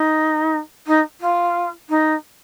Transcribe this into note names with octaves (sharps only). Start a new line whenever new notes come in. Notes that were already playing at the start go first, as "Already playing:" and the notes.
Already playing: D#4
D#4
F4
D#4